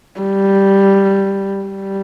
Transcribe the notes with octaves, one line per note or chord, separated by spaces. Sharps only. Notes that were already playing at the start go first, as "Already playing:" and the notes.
G3
G3